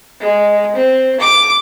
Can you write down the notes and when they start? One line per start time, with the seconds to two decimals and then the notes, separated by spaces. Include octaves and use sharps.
0.20 G#3
0.76 C4
1.20 D6